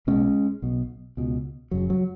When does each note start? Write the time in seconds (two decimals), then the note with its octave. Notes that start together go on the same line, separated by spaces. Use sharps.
0.07 B1 B2 G#3 C#4
0.62 B1 B2
1.17 C#2 B2
1.71 F#1 F#2 C#3 F#3
1.90 F#3